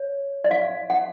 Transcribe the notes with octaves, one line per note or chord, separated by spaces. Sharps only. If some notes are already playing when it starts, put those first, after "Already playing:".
Already playing: C#5
D5
F5
F#5